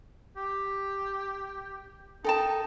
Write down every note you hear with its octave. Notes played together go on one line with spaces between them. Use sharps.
G4
D#4 A4 G5 A5